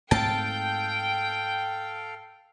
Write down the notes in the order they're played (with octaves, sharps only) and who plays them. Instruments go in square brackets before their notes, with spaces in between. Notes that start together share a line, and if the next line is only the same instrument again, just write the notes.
[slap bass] G#2 A3 C4 [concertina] A4 F5 [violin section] G5 [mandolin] A5